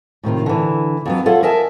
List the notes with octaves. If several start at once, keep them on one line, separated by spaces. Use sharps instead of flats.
A2 C3 D#3 F4
D3 E3
F2 F#3 B3
F4 A4 C#5 E5 F#5
A#4 D#5 E5 G#5 A5